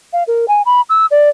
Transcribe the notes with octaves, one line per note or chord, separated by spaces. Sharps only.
F5
A#4
G#5
B5
E6
D5